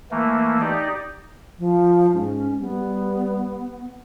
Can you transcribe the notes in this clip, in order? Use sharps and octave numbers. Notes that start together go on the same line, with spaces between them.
E3 A3 A#3
D#4 G4 D5 D#5
F3
G#2 C#4
G3 B3